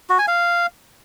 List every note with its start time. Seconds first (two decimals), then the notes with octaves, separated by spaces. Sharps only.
0.10 F#4
0.19 G#5
0.28 F5